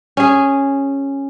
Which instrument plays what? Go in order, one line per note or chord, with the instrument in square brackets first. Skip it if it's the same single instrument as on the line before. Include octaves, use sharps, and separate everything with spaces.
[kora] C#4 G#4